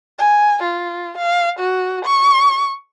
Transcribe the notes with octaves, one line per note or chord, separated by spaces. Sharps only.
G#5
F4
F5
F#4
C#6